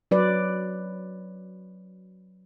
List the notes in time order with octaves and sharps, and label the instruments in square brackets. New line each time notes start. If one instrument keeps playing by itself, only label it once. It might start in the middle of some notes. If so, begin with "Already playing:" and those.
[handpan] F#3 B4 D5